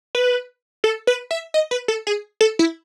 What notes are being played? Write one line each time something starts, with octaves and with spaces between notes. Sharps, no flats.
B4
A4
B4
E5
D#5
B4
A4
G#4
A4
E4